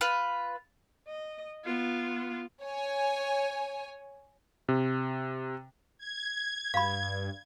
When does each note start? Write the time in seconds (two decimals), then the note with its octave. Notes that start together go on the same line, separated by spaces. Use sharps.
0.01 F4 B4
1.08 D#5
1.65 B3 F4
2.63 C#5 G#5
4.69 C3
5.98 G#6
6.74 G2 F5 B5